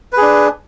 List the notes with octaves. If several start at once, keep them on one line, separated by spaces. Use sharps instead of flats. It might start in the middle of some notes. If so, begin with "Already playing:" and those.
D4 G#4 B4